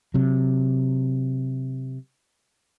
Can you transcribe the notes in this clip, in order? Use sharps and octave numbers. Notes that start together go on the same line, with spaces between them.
C3 F#3